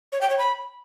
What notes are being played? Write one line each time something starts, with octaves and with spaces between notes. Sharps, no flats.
C#5
G5
C#5
B5